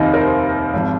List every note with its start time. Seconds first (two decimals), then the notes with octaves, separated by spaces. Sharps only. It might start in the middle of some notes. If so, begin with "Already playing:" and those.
Already playing: F1 D#2 D#3 D#5
0.14 A#4
0.20 C5
0.74 G#1 F3